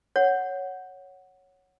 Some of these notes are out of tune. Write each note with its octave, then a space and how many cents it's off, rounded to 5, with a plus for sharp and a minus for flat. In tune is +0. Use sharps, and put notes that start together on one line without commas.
C#5 +0 F#5 +0